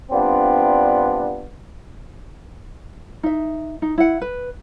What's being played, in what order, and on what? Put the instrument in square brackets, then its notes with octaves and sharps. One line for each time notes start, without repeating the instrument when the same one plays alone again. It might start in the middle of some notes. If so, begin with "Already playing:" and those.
[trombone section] G2 B3 C4 D4 F4
[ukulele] D#4 E5
D#4
E4 F#5
B4